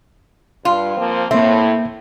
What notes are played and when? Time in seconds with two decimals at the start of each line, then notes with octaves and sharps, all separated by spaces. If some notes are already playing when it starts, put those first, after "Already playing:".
0.65 G2 F4
0.97 F3 A#3 C4
1.31 A2 A#3 C4 E5